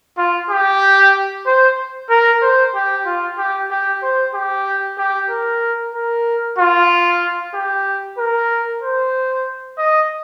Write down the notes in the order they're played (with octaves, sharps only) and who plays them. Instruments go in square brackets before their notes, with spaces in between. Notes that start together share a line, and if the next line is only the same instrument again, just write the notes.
[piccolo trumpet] F4
G4
C5
A#4
C5
G4
F4
G4
G4
C5
G4
G4
A#4
A#4
F4
G4
A#4
C5
D#5